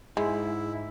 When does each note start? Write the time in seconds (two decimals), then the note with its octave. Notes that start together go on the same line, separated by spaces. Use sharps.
0.17 G#2 G#3 E4